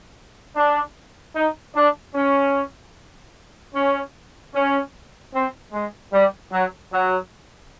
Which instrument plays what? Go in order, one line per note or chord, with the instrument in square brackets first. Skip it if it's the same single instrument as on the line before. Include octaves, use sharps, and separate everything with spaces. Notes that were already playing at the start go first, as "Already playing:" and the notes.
[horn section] D4
D#4
D4
C#4
C#4
C#4
C4
G#3
G3
F#3
F#3